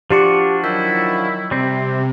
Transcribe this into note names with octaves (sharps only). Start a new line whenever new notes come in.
F3 D4 F#4 G4 C6 D6
D#3 F#3 E4 G6 B6
C3 G3 C4